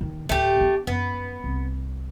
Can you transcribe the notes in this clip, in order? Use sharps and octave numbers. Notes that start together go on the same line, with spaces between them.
D#2 D#3
D2 A2 A3 G4
B3 D4
F#2 B3
C2